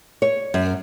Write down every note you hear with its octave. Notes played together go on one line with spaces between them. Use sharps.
C#5
F#2